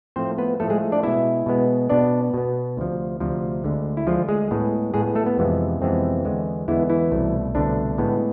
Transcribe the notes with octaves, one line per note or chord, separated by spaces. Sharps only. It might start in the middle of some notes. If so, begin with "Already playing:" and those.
A2 F3 A3 C4 C5
B3 B4
A2 F3 A3 A4
G#3 G#4
D4 D5
B2 G#3 B3 E4 E5
B2 G#3 B3
B2 B3 D4 D5
B2 B3
D2 C3 F3
D2 C3 F3
D2 D3 G#3
E4
D2 D3 F3 G#3 F4
G#3 G#4
A2 G#3 B3
A2 G#3 B3 G#4
A3 A4
B3
F2 C3 E3 G#3 B3
F2 C3 E3 G#3 B3 C4
E2 D3 G#3 B3
E2 D3 E3 G#3 B3 E4
E3 E4
C2 B2 A3
C2 B2 D3 A3 D4
A2 G#3 B3